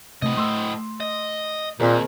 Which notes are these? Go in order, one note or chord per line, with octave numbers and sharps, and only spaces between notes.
A2 C3 A3 D#5
A3 C6 E6
D#5
D#2 A#2 C4 G#4 A#4